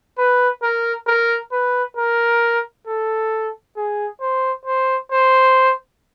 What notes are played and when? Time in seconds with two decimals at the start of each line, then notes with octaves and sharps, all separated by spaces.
0.18 B4
0.63 A#4
1.07 A#4
1.52 B4
1.97 A#4
2.87 A4
3.76 G#4
4.21 C5
4.66 C5
5.11 C5